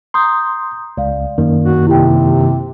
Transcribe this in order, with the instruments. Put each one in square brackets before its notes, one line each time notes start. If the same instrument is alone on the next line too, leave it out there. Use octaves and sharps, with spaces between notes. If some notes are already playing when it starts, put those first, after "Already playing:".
[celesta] A#5 D#6 G6 [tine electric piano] C6
[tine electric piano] C#2 [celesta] D5 F5
[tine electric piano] F#2 D#3 A#3
[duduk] F#4
[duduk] C3 [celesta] E4 G4 G5